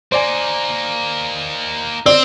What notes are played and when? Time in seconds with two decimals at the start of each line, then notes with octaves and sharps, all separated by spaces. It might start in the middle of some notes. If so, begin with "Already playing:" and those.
0.12 A#3 D#4 C5 D5 G#5
2.06 C4 D5